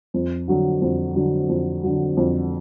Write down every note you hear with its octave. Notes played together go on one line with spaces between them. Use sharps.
F2
D3 F#3
F2
D3 F#3
F2
D3 F#3
F2